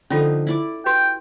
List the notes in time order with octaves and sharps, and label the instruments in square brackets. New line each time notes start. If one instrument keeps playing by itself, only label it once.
[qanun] D3 F3 D#4 [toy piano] C#4 F4 A4
[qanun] E4 D5 D6
[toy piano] F#4 G4 B4 [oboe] G5